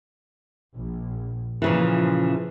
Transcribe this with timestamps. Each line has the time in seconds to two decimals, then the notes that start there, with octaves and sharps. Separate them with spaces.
0.74 A#1
1.62 A#2 C#3 E3 F3